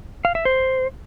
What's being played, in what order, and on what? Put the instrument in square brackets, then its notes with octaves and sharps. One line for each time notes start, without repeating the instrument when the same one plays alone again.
[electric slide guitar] F5
E5
C5